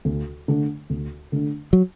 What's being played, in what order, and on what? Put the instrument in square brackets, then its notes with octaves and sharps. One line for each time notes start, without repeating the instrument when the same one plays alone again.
[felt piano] D2
D3 A3 D4
D2
D3 A3 D4
[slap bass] F#3